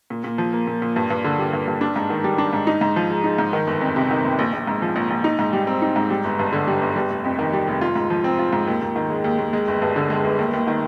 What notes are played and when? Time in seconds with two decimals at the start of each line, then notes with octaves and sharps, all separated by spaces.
0.10 A#2
0.24 A#2
0.38 F3
0.53 A#3
0.67 A#2
0.82 A#2
0.96 G2
1.10 G2
1.24 D3
1.39 G3
1.53 G2
1.68 G2
1.81 D4
1.96 G#2
2.10 D#3
2.24 G3
2.38 D4
2.53 G#2
2.67 D#4
2.81 G#2
2.96 F3
3.10 G#3
3.24 D#4
3.38 G#2
3.53 D#3
3.67 G1
3.81 F2
3.96 C3
4.11 D#3
4.24 G1
4.39 A#1
4.53 A#1
4.67 G#2
4.82 F3
4.96 A#1
5.10 A#1
5.24 D#4
5.39 G#2
5.53 G3
5.67 C4
5.82 D#4
5.96 G#2
6.10 G3
6.24 G1
6.39 G2
6.53 D3
6.67 G3
6.81 G1
6.96 G3
7.10 F1
7.25 F2
7.39 D#3
7.53 G3
7.67 F1
7.81 F4
7.96 G#2
8.10 F3
8.24 C4
8.39 F4
8.53 G#2
8.67 D#2
8.82 D#2
8.96 D#3
9.10 G#3
9.24 D#2
9.39 D#2
9.53 G#3
9.68 G1
9.82 G2
9.96 D3
10.10 G#3
10.25 G1
10.39 D#2
10.53 D#2
10.67 D#3